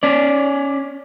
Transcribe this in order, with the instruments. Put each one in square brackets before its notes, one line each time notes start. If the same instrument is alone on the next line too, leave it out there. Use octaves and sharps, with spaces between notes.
[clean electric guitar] C#4 D5